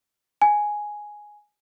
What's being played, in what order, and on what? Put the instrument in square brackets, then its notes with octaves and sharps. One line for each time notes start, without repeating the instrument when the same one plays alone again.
[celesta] G#5